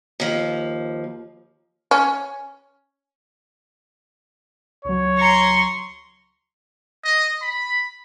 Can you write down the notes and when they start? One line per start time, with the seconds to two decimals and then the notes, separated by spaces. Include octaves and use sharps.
0.20 D#2 F3
1.91 C#4
4.85 C#2 F#3 C#5
5.18 A#5 C6 C#6
7.04 D#5
7.42 B5